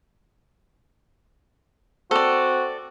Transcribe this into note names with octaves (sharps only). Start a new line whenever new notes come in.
C4 F#4 A4 D5